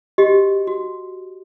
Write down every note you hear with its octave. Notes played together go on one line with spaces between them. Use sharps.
F#4 G4 D#5
F#4